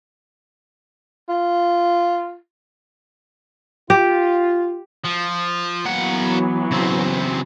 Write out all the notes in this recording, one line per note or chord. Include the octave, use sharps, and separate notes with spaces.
F4
F4 G4
F3
E3 F#3 A#3 B3 F#5
C#3 C4